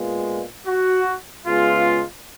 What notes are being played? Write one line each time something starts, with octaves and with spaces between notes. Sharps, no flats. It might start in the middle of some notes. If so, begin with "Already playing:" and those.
Already playing: A#2 G#3 B3 F4
F#4
C#3 G#3 B3 F4